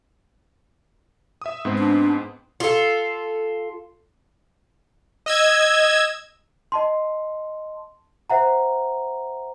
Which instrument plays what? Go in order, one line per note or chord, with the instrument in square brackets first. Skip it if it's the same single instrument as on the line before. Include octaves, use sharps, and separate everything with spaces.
[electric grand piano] E5 D#6
G#2 B3 C4
[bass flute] D4
[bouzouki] F4 A4
[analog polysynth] D#5 E6 G#6
[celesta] D#5 A5 C6
C5 E5 F#5 A#5